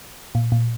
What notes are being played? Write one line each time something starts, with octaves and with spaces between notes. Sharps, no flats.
A#2
A#2